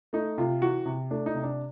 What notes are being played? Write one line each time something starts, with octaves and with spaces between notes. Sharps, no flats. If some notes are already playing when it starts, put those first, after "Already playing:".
A3 D#4
C3 F4
E3 F#4
C3
A3 D4
D#4
C3
D4